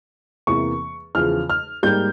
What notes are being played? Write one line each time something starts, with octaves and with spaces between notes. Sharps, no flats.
E2 C3 E3 A#3 C#6
E2 C#3 F3 F6
F6
G#2 G3 A#3 G6